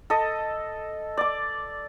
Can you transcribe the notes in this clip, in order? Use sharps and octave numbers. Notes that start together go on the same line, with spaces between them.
A4 D#5
D5 D6